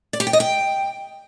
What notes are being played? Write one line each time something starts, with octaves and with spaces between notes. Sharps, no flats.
D5
G4
G5
D#5
G5